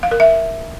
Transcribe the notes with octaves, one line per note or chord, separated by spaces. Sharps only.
F5
A#4
E5